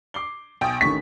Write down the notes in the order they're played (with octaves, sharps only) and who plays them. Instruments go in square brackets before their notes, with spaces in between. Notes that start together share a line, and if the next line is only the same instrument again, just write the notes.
[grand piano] D6 C7 G7
[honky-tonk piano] B1 G5 [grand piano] G#5 D#6
[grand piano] A1 D3 D#3 [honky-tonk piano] C#6 B6